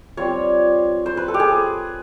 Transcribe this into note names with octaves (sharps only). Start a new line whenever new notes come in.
G3 C4 F4 C#5
C5
B4
A4
G4
G#4